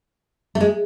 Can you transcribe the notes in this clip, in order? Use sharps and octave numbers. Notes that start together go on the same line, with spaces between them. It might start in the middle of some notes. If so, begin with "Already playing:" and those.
A3
G#3